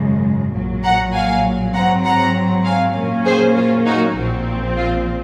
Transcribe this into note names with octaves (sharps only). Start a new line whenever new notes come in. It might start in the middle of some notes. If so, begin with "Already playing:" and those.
Already playing: G#1 F#2 C#3 G#3
A#1 A#2 F#3
F#5 A#5
F5 G#5
G#2 F#3 C4 F#5 A#5
F#5 A#5
F5 G#5
A#2 F#3 A#3 C#4
G#4 C5
F4
D#4 F#4
A#1 A#2 F3 C4
F4